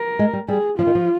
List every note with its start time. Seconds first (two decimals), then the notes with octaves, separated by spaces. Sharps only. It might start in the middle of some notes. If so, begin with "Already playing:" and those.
Already playing: A#4
0.19 G#3
0.33 G3
0.48 G3 G#4
0.78 F3 F4
0.87 D#3
0.95 F3